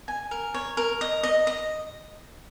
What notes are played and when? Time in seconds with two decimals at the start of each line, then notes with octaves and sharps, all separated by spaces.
0.08 G#5
0.31 A#4
0.54 C#5
0.77 A#4
1.01 D#5
1.23 D#5
1.47 D#5